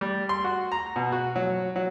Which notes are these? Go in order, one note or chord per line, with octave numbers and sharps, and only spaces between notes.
G3
C6
F#4
A#5
B2
F#4
F#3
F#3